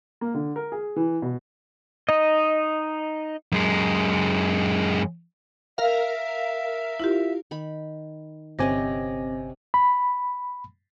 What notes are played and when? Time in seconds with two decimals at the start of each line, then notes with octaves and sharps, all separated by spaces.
0.21 A#3
0.34 D3
0.56 A#4
0.72 G#4
0.96 E3
1.22 B2
2.09 D#4 D#5
3.52 F#2 G#3
5.78 A#4 E5 F5
7.00 E4 F4 G4
7.51 D#3 B5
8.59 G1 C3 C4 C#4 D#5 G#5 D6 A#6
9.74 B5